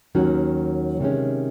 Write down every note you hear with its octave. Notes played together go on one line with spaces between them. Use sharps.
D#2 D#3 F#3 C#4 F#4
C3 D#3 G#3 C#4